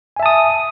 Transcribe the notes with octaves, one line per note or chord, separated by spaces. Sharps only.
E5 G#5 A5 D#6